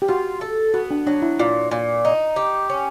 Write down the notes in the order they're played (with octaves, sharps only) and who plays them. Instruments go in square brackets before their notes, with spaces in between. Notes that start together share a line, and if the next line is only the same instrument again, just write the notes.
[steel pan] G4
[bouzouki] F4 [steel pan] F#4
[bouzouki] A4
[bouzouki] B3 [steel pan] F#4
[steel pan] D4
[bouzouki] F#3 [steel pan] D4
[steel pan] E4
[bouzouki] A#2 [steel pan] F4
[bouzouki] A#2
D#4
G4
C#4